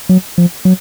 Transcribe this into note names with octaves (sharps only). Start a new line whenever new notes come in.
F#3
F3
F#3